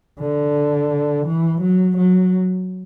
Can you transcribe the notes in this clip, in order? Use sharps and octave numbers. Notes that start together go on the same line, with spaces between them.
D3
E3
F#3
F#3